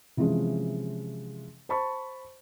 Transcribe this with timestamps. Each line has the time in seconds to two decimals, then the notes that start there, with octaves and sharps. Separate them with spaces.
0.17 C3 E3 F3 G#3 C#4
1.69 C5 A5 B5 C#6